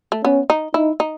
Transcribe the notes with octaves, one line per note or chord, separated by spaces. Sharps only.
A3
B3 C#4
D#4
D#4 E4
D#4